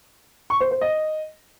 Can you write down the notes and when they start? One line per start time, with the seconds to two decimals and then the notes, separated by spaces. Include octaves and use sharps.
0.50 C#6
0.61 C5
0.71 C5
0.81 D#5